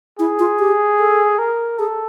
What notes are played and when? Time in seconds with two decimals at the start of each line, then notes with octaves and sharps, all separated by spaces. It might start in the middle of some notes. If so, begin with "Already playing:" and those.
0.19 E4 G#4
0.39 F4
0.59 G4
0.99 A4
1.39 A#4
1.79 G#4 A4